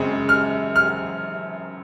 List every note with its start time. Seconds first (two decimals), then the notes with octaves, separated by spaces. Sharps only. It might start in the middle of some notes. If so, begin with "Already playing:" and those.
Already playing: F#2 C#3 G#3 C4
0.29 F6
0.76 F6